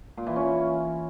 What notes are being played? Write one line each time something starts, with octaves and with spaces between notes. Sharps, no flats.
A#2
E3
C#4